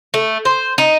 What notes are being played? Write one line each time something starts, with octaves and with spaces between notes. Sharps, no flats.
A3
C5
D#4